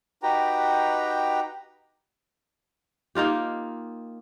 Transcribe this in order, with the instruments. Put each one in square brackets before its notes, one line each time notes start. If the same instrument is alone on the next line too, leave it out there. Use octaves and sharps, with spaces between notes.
[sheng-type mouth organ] D#4 F#4 G4 B4 G5 A#5
[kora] A#3 D#4 F4 G4